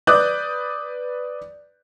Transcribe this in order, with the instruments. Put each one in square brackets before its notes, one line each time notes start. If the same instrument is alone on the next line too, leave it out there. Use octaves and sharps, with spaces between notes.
[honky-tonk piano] B4 D5 D6 D#6 F#6 G6